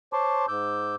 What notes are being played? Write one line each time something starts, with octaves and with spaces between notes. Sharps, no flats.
C5 C#5 A5 C6 D6
G#2 D6 E6 G6